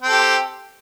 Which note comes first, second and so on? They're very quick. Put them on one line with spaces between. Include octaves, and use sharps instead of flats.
C4 A4 G4